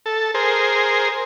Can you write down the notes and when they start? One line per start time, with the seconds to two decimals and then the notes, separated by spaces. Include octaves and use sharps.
0.06 A4
0.34 G#4 A#4 C5